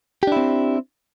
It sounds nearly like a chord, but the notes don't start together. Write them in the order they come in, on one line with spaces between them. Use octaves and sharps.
G4 D4 E4 C4